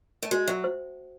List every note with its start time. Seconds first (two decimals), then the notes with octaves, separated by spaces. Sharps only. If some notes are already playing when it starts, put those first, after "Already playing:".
0.23 A3
0.31 G#3 F#4
0.48 F#3 E5
0.64 C5